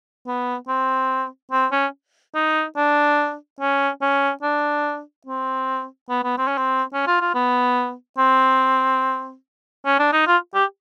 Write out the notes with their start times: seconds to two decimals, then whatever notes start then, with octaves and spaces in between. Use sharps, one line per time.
0.27 B3
0.68 C4
1.52 C4
1.72 C#4
2.35 D#4
2.77 D4
3.60 C#4
4.02 C#4
4.43 D4
5.27 C4
6.09 B3
6.24 B3
6.38 C4
6.48 C#4
6.58 C4
6.93 C#4
7.07 F4
7.21 F4
7.35 B3
8.18 C4
9.86 C#4
9.99 D4
10.13 D#4
10.27 F4
10.55 G4